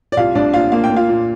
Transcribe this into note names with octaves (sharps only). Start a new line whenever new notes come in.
D5
C2 F4 F5
C2 D4 D5
A#2 F4 F5
A#3 F5
G5
A#3
F4 F5
A#2